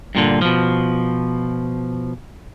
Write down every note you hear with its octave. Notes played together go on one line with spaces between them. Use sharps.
G2 A#2 D3
B2 F3